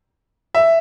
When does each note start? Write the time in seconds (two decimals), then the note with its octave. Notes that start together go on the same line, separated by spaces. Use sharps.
0.55 E5